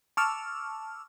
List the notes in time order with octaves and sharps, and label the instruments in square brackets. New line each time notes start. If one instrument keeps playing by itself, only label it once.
[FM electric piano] A5 C#6 D6 E6 F6